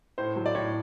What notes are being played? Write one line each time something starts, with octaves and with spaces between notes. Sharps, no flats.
A2 C5
F#3
D5
A2 C#5